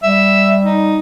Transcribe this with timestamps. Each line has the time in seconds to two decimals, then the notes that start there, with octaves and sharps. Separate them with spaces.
0.03 G3 E5
0.64 D#4